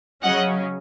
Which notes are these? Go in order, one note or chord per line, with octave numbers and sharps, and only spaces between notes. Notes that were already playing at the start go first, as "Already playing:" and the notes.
C#3 F#3 C#4 D#5 F#5